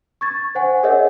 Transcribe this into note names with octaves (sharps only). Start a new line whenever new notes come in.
C#6 G#6 A6
C5 F#5 G#5
G#4 A#4 C#5 D#5 E5 F#5